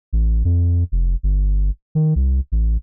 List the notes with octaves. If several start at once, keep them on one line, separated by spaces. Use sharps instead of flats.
A1
F2
F1
G1
D#3
C2
A1